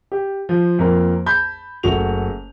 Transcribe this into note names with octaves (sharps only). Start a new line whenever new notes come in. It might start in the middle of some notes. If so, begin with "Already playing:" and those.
G4
F3
F2 A#3
A5 B5 G6
F#1 A3 F#4 F7